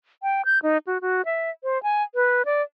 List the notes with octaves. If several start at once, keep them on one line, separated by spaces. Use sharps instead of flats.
G5
G6
D#4
F#4
F#4
E5
C5
G#5
B4
D5